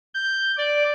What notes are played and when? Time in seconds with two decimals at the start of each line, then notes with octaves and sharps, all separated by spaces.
0.14 G6
0.57 D5